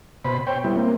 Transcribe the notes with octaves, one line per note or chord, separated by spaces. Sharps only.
B2 C5 B5
C5 C#5 G5
G3 B3 E4
A#3 C4